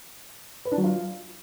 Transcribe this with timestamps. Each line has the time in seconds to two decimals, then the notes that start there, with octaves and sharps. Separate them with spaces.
0.65 B4
0.72 D4
0.78 F#3
0.84 F4